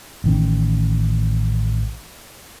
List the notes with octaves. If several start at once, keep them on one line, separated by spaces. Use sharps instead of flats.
A1 D#3 C#4